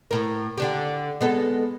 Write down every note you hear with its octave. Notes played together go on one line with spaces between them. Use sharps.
A2 A#4
D3 D4 G4
G#3 B3 A4